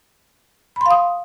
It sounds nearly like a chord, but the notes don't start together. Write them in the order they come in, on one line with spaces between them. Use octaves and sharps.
B5 C6 F5 D#6